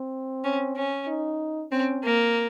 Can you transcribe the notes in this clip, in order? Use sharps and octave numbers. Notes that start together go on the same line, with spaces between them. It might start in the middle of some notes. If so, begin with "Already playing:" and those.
Already playing: C4
C#4
C#4
D#4
C4 C#4
A#3